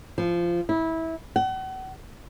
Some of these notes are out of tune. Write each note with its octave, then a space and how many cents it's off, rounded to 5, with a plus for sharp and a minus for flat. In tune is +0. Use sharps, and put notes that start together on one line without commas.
F3 -15
E4 -20
F#5 +40